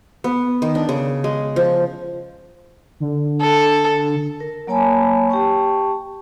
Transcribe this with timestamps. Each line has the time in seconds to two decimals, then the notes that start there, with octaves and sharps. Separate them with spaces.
0.24 B3
0.62 D#3
0.75 D4
0.89 C#3
1.24 G#3
1.56 F3
3.00 D3
3.41 A4
4.40 A#4
4.67 F#3 A#3 C#5 G#5 A5 B5
5.30 G4 G5 A5 C#6